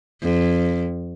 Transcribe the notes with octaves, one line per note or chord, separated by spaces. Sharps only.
F2